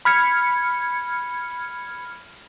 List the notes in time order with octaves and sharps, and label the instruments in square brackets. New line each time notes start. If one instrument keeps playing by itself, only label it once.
[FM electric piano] B5 F6 G#6 C#7